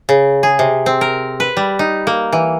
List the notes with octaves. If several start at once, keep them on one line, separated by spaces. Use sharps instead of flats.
C#3
G#4
C3
C4
A#4
B4
G3
D#4
A#3
E3